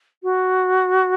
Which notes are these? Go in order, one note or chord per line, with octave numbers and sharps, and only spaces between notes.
F#4